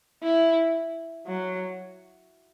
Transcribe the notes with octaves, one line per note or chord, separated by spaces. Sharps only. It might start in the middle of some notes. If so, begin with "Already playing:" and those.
E4
F#3